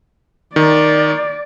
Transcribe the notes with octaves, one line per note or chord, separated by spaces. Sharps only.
D#3 D5